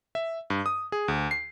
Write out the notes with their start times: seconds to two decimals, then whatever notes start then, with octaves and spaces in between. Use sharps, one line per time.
0.15 E5
0.50 G2
0.66 D#6
0.92 G#4
1.08 D2
1.31 C7